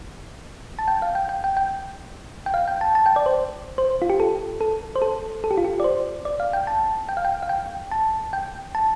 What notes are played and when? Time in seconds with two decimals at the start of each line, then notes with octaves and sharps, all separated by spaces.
0.79 A5
0.88 G5
1.02 F5
1.15 G5
1.29 G5
1.44 G5
1.57 G5
2.46 G5
2.54 F5
2.68 G5
2.81 A5
2.95 A5
3.06 G5
3.16 D5
3.26 C5
3.78 C5
4.02 F4
4.10 G4
4.20 A4
4.61 A4
4.96 C5
5.02 A4
5.44 A4
5.51 G4
5.58 F4
5.65 G4
5.80 D5
5.84 C5
6.25 D5
6.40 F5
6.53 G5
6.67 A5
7.09 G5
7.17 F5
7.25 G5
7.43 F5
7.49 G5
7.91 A5
8.33 G5
8.75 A5